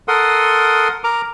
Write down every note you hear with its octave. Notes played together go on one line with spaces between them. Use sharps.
A4 A#4 F#5 C6 D#6
A#4 A#5 D6